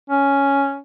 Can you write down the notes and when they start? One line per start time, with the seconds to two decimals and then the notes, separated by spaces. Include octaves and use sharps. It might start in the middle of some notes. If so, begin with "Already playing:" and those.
0.10 C#4